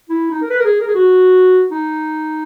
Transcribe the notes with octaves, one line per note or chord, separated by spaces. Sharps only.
E4
D#4
A#4
B4
A#4
G#4
A#4
G#4
F#4
D#4